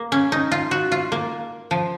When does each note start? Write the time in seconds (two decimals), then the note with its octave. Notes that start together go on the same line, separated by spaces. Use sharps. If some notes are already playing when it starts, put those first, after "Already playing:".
Already playing: A#3
0.12 C#4
0.32 D#4
0.52 F4
0.71 F#4
0.92 F4
1.12 A#3
1.71 F3